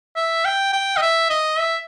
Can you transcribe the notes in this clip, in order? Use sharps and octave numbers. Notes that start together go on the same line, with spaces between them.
E5
G5
G5
D#5
E5
D#5
E5